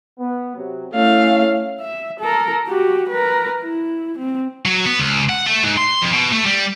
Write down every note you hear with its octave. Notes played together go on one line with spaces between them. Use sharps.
B3
C3 F#3
A3 C#4 E4 C#5 F5
E5
A4 A#4
F#4 G4
A#4 B4
E4
C4
F#3
B3
C#2
F#5
A3
G#2
C6
F2
B2
A3
G3